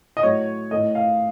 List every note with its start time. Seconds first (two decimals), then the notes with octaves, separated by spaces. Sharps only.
0.17 D#5
0.23 A2 F#3 A3 C#5
0.71 A2 A3 D#5
0.95 F5